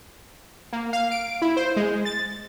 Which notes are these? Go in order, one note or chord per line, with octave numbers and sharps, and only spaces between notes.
A#3
F5
D7
E4
C5
G#3
A6